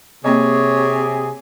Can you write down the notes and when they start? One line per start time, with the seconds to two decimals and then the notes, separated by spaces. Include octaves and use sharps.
0.24 C3 A#3 C4 G#4 C#5 D#5